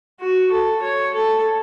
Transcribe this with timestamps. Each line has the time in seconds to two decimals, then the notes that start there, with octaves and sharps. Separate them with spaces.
0.20 F#4
0.52 A4
0.82 C#5
1.14 A4